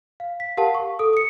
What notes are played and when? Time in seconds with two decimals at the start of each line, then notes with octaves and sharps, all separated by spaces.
0.20 F5
0.40 B6
0.57 G4 A#4 F5 F#5 A5
0.75 C#6
0.99 A4 D#6
1.13 D#6 C#7